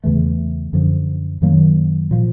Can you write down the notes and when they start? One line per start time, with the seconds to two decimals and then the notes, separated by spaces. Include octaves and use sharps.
0.04 E2 C#3 E3 A3
0.73 F#2 D3 F3
1.42 F#2 D#3 F#3 A#3
2.11 A#2 F3